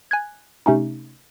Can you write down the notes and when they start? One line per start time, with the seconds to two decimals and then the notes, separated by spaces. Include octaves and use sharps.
0.11 G#5 F#6 G#6
0.66 C3 A3 C#4 D#4